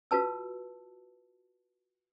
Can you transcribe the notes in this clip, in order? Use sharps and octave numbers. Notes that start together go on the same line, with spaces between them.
F4 F#4 B4 A5 E6